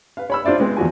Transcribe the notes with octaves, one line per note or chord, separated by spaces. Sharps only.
B4 F5
C#5 B5 E6
D4 F4 C5 D5 E5
G#3 B3 C4
E2 F3 F#4 G#5